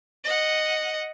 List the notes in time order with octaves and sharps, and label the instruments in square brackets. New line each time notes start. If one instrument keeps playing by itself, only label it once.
[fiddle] D#5 F#5